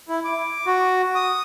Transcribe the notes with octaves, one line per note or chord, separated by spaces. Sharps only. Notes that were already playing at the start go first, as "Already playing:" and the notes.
E4
D6
F#4
D#6